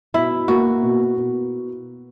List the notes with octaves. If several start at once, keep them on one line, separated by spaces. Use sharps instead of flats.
B2 E4
A#3 F#4
B2
B2